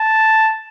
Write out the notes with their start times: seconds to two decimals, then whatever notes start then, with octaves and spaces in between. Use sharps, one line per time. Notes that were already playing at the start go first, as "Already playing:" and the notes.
Already playing: A5